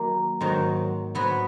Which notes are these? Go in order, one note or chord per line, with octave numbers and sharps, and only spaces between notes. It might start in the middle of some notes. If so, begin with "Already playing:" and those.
Already playing: D#3 F#3 A#3
G#2 D#3 F#3
G#2 F#3 B3